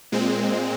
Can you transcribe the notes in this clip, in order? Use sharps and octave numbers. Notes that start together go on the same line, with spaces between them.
A#2 G#3 C4